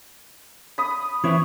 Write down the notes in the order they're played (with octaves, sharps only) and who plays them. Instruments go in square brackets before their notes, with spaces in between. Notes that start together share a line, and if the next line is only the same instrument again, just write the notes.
[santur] B5 D#6
[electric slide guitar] E3 C4 E4 [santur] C#5